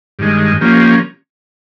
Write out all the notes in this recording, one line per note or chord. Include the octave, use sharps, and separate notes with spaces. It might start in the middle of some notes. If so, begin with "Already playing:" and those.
G2 D#3 G#3
F3 A#3 C#4 G4